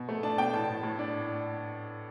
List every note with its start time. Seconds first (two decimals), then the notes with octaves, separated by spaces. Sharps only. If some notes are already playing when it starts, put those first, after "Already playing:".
Already playing: B2
0.09 A3
0.23 D4 A5
0.38 B2 G5
0.54 A2 A5
0.69 A2
0.83 A2
0.99 D4